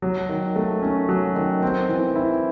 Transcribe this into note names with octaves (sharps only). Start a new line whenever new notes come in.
F#3
D#3
A3
C#4
F#3
D#3
C4
E3
E4